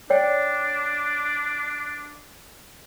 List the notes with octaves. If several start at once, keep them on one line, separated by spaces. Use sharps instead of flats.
D4 C#5 D5 G5